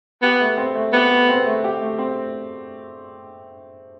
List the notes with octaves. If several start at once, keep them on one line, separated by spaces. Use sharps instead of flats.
B3 G4
A3
C4
A3
B3 G4
A3
C4
A3
G4
A3
C4